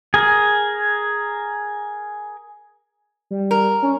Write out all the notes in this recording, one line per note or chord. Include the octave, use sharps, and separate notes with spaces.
G#4 A#4
G3
A#4
C#4